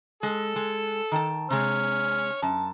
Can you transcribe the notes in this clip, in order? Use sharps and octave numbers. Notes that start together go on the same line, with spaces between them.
G#3 A4
G#3
D#3 G5 A5
C3 G#3 C#5 F6
F#2 A5